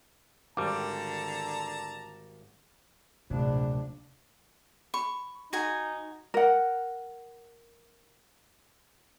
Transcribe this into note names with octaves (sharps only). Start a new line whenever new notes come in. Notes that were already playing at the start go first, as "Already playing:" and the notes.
G#1 D3 G3 A5 A#5 D6
D1 A#1 C3 D4
B5 C#6
D#4 F#4 G#5
A#4 F#5